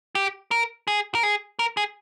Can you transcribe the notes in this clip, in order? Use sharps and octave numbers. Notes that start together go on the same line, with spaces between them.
G4
A#4
G#4
A#4
G#4
A#4
G#4